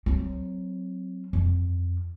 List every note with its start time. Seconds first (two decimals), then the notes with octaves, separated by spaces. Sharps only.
0.06 F#3 C4
1.33 F2